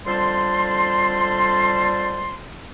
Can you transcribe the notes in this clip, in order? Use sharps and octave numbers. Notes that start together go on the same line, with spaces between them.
F2 D3 G3 A5 C6